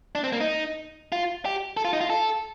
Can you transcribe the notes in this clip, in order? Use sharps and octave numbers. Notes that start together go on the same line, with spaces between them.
D4
C4
A#3
D#4
F4
G4
A4
F4
D#4
F4
A4